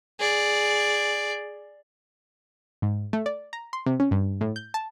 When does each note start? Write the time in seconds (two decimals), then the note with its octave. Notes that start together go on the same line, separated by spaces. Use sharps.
0.20 G#4 D5
2.82 G#2
3.13 A3
3.26 D5
3.53 A#5
3.73 C6
3.86 C3
4.00 C#4
4.11 G2
4.41 A2
4.56 G6
4.74 A5